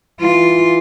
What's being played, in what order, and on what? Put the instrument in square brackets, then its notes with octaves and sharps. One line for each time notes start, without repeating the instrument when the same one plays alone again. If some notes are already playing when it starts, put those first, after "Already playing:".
[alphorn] E3 [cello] F4